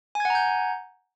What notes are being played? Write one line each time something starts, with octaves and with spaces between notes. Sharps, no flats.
F#5 G#5 A#5 G6 G#6